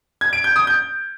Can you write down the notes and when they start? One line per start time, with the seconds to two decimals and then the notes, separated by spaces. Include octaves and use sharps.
0.21 G#6
0.33 D7
0.44 G6
0.56 D#6
0.67 G6